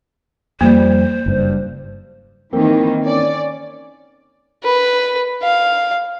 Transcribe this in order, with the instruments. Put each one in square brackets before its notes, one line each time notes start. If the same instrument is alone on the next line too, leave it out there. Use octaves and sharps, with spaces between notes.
[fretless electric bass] F2 G3 [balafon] A#3 [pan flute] C5
[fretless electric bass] F#1 G2
[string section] D#3 E3 [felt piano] A#3 C4
[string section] C#4 D5
[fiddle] B4
F5